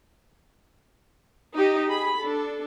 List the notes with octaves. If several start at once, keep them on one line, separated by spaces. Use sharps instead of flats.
D#4 G4 D#5
G#4 B5
D4 A4